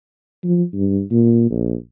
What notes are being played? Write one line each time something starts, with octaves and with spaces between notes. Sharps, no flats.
F3
G2
A#2
A#1